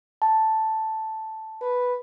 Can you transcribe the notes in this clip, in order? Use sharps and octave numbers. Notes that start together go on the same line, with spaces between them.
A5
B4